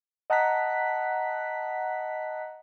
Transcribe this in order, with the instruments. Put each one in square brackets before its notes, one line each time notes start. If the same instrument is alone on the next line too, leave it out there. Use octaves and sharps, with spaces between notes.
[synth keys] D#5 F#5 A5 A#5 F#6 B6